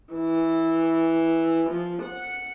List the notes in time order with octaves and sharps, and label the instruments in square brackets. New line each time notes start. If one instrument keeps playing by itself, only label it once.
[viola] E3
F3
F#5